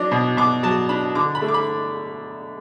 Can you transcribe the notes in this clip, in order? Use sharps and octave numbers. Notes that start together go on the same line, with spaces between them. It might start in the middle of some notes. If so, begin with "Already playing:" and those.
Already playing: F#3 D4 D5
B2
B2 D6
F#3 A5
D4 B5
D3 D6
B5
A3
D6
B5